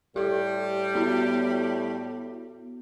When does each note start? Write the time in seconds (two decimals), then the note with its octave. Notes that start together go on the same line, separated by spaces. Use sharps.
0.16 A2 G3 G4 A4
0.95 B3 E4 F#4